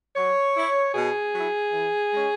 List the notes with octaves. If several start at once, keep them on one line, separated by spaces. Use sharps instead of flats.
F#3 C#5
E4
B2 G#4
F#3 E4
E3
G#3 C#4